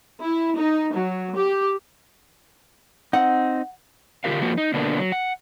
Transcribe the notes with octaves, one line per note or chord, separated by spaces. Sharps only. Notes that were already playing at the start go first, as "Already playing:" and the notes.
E4
D#4
F#3
G4
C4 D#4 F#5
D3 F4 G4 A#4 F5
F3 A#3 F#4
D#4
B2 D3 A#3 B3 D4
F#3
F#5